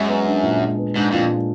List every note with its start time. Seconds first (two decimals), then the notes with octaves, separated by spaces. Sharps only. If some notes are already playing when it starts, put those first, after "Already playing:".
Already playing: F#2 G#3
0.09 B3
0.26 D4
0.43 A#2
0.61 G#3
0.78 B3
0.95 G#2 D4
1.12 F2 A#2
1.30 G#3